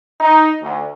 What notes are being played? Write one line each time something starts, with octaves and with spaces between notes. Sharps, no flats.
D#4
D2